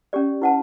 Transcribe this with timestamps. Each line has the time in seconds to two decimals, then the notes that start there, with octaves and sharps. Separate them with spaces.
0.13 C#4 G4 D5
0.42 E4 B4 F#5 A5